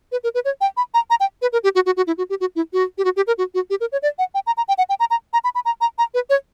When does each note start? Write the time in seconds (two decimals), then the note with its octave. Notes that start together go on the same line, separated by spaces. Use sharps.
0.12 B4
0.24 A#4
0.35 B4
0.45 C#5
0.61 G5
0.77 B5
0.94 A#5
1.10 A#5
1.20 G5
1.42 B4
1.53 A#4
1.64 G4
1.75 F#4
1.86 F#4
1.97 F#4
2.07 E4
2.18 F#4
2.30 G4
2.41 F#4
2.56 E4
2.73 F#4
2.98 G4
3.05 F#4
3.16 G4
3.27 A#4
3.38 F#4
3.54 F#4
3.70 G4
3.81 A#4
3.92 C#5
4.02 D5
4.19 F#5
4.35 G5
4.47 A#5
4.57 A#5
4.68 G5
4.78 F#5
4.89 G5
5.00 A#5
5.10 A#5
5.33 A#5
5.44 B5
5.55 B5
5.65 A#5
5.81 A#5
5.98 A#5
6.14 B4
6.30 C#5